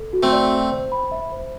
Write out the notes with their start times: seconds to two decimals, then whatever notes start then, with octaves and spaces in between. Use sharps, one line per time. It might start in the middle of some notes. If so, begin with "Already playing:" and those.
Already playing: A4
0.13 F#4
0.23 A3 C4
0.32 D5
0.53 G5
0.72 C5
0.92 B5
1.12 E5
1.32 C5